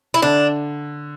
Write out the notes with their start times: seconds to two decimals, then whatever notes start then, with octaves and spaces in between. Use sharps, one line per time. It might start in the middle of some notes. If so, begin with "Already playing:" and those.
0.14 E4
0.22 D3 D4